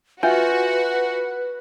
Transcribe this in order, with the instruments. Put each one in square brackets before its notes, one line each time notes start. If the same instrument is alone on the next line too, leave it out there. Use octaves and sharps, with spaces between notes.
[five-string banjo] F4 [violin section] F#4 [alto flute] B4 [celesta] E5 G#5 G6